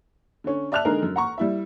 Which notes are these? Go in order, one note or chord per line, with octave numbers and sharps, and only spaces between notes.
D3 C#4
D5 E5 A5 F6 F#6 F7
D3 G#3 D#4 G#4 A#4
F#2
F#5 A#5 C#6
G3 E4 E5